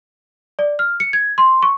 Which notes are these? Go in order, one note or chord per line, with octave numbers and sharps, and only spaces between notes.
D5
F6
C#7
G#6
C6
C#6